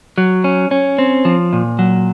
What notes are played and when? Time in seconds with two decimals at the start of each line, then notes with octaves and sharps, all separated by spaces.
0.18 F#3
0.44 C#4
0.71 C#4
0.98 C4
1.25 F3
1.53 A#2
1.79 F#3